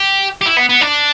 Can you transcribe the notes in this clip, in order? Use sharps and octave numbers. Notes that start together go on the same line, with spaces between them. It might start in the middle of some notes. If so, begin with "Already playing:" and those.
Already playing: G4
G4
E4
B3
B3
D4